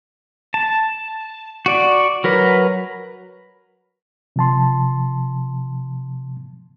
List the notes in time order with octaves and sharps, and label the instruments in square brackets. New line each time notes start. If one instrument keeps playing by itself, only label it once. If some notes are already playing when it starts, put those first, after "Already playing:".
[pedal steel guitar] A5
F#4 D5
F#3 A#4 B4
[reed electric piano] C3 F3 A5 C6